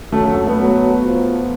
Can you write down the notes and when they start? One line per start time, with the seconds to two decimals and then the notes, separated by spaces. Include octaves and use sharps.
0.12 F#3 A3
0.24 A3
0.34 A3
0.47 B3
0.58 F#3
1.04 F3